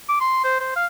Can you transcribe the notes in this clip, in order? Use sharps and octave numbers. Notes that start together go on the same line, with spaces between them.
D6
C6
C5
C5
F5